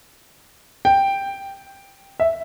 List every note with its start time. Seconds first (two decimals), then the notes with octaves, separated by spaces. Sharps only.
0.85 G5
2.20 E5